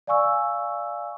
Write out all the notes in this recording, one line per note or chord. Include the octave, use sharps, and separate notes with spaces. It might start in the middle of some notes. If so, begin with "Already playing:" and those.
D5 F5 G#5 C#6 E6